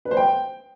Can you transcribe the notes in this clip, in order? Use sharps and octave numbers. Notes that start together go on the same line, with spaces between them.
B4
C5
G5